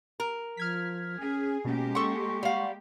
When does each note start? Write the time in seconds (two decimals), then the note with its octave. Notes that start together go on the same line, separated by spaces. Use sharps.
0.20 A#4
0.57 F3 F6 G#6 B6
1.20 C#4 G#4
1.65 B2 G#3 A#3 C#4 G4
1.95 A4 F#5 C6 C#6
2.43 G3 F5 F#5